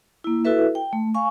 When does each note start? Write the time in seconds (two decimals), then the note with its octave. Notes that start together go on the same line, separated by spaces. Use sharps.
0.24 A#3 E4
0.45 E4 F#4 A4 B4 E5
0.75 G5
0.93 A3
1.15 F5 G#5 C#6